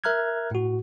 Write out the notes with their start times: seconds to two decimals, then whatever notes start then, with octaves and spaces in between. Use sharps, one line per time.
0.04 A#4 E5 A#5 F6 F#6 G#6
0.51 A2 F#4